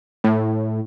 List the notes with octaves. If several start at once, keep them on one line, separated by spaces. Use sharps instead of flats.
A2